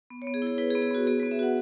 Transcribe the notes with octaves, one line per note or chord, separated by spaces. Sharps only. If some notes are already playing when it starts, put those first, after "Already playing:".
B3
C#5
B3
G#4
E4
G#4
E4 B4
G#4
B3
G#4
B3 F#4
B3 G#4
B4
B3
E5
F#4 F#5